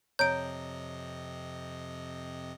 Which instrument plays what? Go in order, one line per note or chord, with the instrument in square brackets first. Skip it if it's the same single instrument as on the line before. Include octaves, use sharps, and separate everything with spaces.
[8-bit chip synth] F2 C3 D#5 [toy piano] C#5 A#5 [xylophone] G6 D7